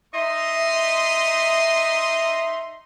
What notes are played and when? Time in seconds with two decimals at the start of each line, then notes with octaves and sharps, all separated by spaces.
0.14 D#4 D#5 E5 C6